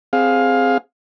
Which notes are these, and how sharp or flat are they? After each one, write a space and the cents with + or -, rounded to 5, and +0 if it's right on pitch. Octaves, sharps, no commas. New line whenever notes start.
C4 +0 G#4 +0 F5 +15